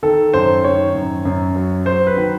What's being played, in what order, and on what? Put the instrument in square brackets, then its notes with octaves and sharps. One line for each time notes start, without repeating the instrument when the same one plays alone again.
[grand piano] D#3 A4
F#2 C5
D#3 C#5
F#2
F#2
F#3
F#3 C5
B4
D#3